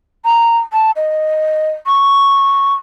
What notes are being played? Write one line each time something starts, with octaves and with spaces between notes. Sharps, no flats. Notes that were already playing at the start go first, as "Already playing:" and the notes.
A#5
A5
D#5
C#6